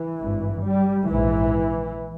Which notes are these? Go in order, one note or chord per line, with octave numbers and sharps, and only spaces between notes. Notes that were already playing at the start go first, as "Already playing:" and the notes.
Already playing: E3
G#1 G2
G3
A#1 G#2 E3